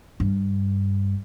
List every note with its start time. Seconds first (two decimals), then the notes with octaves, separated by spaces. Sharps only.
0.20 G2